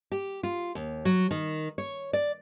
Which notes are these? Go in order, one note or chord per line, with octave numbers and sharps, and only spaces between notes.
G4
F4
D#2
F#3
D#3
C#5
D5